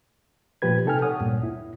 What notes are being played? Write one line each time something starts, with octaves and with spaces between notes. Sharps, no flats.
A#2 F3 G4 B4 G#6
C3 D#4 A4 G5 G#5 F6
C#5 F#5 D#6
D2 G2 A#2
E4